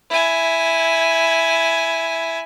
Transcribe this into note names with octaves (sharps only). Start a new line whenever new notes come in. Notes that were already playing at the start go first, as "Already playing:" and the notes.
E4 G#5